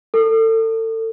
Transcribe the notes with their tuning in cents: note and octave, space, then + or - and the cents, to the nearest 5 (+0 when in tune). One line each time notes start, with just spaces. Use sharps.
A4 +30